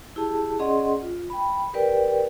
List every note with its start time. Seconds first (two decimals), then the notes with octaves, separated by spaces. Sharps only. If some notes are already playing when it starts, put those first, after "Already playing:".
0.16 E4 G4 G#4 A5
0.59 C#4 G#4 D5 D#5 F#5 C6
1.02 F4
1.30 G5 B5
1.73 G4 A#4 B4 D5 G5